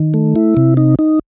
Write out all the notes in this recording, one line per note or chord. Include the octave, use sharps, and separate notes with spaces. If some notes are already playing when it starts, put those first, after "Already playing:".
Already playing: D#3
A3
E4
C3
D#4
D#4